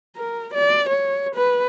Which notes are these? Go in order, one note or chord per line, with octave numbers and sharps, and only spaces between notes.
A#4
D5
C#5
B4